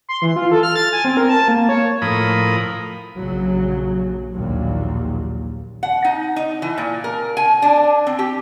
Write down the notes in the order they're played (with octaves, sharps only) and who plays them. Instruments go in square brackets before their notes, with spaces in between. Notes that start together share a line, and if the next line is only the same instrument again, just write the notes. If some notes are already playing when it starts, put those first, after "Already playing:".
[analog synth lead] C6
E3
F4
A4
F6
A6
G#5
C4
A#4
A5
A#3
C#5
[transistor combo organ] A2 F3 A#4 B5 D#6
[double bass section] A#1 C#3 F#3
A#1 D#2 A#2 F#3
[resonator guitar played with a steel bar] F#5
D#4
D#4
E3
A#2
A#4
G#5
D4
C4
G4